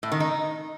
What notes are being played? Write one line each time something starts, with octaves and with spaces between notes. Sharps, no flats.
A2
D#3
D#4